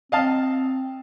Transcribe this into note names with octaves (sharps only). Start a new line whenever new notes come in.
C4 D#5 F5 A5